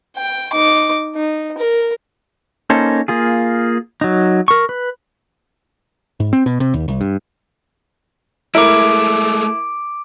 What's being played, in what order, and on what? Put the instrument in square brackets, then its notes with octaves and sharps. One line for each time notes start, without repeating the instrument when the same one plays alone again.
[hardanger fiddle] G5
D#4 D6
D#4
A#4
[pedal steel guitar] A#3 C#4 D#4 A4 C5
A#3 F4 G#4
F#3 D#4
A#4 C#6
B4
[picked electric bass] G#2
C4
B2
C3
D#2
C2
G2
[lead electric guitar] G#3 A3 [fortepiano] E4 A#4 [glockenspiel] D6 D7